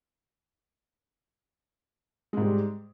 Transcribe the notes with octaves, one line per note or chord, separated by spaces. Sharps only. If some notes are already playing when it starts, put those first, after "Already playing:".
G#2 G3 G#3